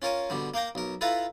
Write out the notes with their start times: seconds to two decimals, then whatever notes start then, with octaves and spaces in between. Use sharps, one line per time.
0.02 C#4 F4 A#4 C#5 G#5
0.30 B2 D3 G3
0.54 A#3 F5 G5 A#5
0.75 B1 A#4
1.01 E4 F4 A4 B4 F5 A#5